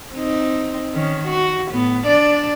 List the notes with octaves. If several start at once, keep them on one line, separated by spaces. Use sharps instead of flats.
C4 D#4
D#3 C#4
F#4
A2 B3
D4 D5